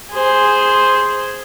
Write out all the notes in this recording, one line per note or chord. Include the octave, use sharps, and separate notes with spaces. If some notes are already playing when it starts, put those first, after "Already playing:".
G#4 C5